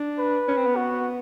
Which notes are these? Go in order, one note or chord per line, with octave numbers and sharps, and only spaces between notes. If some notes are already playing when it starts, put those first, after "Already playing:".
Already playing: D4
B4
C#4
C4
B3
F#4